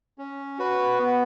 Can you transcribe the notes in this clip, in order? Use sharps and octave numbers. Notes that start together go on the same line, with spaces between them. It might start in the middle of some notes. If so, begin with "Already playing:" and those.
C#4
F#4 B4
B3